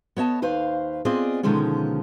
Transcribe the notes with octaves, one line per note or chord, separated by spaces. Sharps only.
B3 C#5 D#5 A5
D#2 B4 C5 F5
B3 C4 F4 G#4 D5 D#5
B2 D3 D#3 F3 G#3 C#4